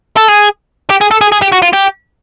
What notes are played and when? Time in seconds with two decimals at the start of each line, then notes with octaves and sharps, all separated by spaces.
0.16 A4
0.28 G#4
0.90 G4
1.01 G#4
1.11 A4
1.21 G#4
1.32 G#4
1.42 G4
1.52 F#4
1.62 F4
1.73 G4